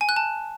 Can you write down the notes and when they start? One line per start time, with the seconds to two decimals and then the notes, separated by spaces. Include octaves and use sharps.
0.01 G#5
0.09 F#6
0.16 A5